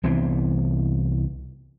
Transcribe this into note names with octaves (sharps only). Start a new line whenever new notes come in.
C2 E3 B3 C4